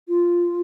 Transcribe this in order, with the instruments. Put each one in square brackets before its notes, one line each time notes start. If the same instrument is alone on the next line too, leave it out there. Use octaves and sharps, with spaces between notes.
[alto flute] F4